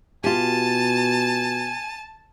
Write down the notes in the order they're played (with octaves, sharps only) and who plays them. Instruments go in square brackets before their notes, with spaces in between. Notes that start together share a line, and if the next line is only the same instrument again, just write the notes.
[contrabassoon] B2 [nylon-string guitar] F4 G4 [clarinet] G#5 [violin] A5